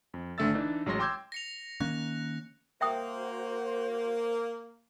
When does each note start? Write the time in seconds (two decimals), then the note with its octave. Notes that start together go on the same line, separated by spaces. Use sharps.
0.14 F2
0.38 G#1 D3 A3 E5 E6 A6
0.54 E3 D4 D#4
0.86 A1 F#3 G#3 C#5 C6 A#6
0.99 G5 C6 D6 E6 G6 G#6
1.32 A#6 C#7 F7
1.80 D#3 A#3 C#4 F#6 A#6
2.81 A#3 F#4 C5 E5 G5 D#6